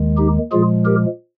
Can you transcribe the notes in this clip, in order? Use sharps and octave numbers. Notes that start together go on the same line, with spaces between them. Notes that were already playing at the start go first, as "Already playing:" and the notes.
Already playing: D#2 D#3 G#3
D#4 G4
A#2 F3 G#3 F4 G#4
G4 A#4